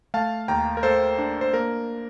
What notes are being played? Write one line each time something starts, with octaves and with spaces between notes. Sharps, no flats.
A3 F5 A5
D#2 G5 A#5
A#4
A3 A4 C5
D4
C5
A#3 A#4